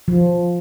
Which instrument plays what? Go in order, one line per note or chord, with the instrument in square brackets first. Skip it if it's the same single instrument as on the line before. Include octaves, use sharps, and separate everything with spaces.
[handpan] F3